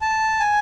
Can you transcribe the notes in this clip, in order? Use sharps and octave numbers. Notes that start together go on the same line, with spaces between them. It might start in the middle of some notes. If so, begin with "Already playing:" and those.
A5
G#5